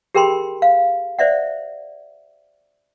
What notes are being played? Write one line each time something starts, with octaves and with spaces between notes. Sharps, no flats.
G4 G#4 A#4 G5 B5 C6
F5
C5 D5 E5 F#5